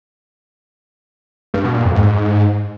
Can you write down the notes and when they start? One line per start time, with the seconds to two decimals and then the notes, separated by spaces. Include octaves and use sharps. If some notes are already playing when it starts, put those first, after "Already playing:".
1.54 G2
1.64 B2
1.75 A#2
1.85 F2
1.95 G#2